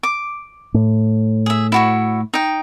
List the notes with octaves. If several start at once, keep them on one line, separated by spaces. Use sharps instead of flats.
D6
A2
G#4 E5
E4 F#4 C#5
D#4 G5